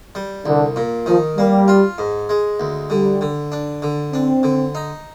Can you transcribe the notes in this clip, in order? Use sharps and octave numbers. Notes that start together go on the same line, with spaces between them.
G3
C2 D3
A#2
D#3 F3
G3 A#3
F4
G#2
G#3
D2
D3 G3
D3
D4
D3
C4 D4
D3
D#4